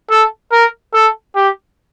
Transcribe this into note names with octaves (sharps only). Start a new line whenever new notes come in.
A4
A#4
A4
G4